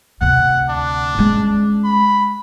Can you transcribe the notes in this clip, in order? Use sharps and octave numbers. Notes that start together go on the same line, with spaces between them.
D2 C3 F#5
D4
G#3 C#4
B5